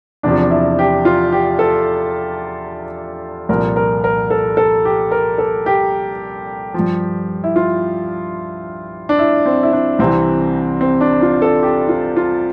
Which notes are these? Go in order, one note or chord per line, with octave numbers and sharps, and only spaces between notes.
E2 C3 F3 D4
E4
G4
F4
G4
A4
C2 A#2 F3 A#4
A#4
A#4
A4
A4
G4
A#4
A4
G4
G2 F3
E4
F4
D4
E4
C4
E4
D4
C2 C3 E3 C4
C4
D4
F4
A4
G4
F4
F4